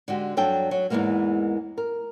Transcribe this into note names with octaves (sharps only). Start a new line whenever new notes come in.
D3 G#3 F#4 G4
G2 F#3 D4 A4 G5
F#3
E2 G#2 E3 G#3 A#3 A#4
A#4